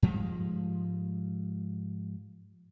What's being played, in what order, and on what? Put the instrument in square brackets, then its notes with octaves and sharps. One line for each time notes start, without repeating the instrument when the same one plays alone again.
[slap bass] G#2 F3 G3 G#3